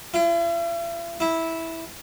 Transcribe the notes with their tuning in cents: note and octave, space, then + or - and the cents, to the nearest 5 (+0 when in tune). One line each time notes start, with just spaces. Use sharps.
E4 +45
E4 -10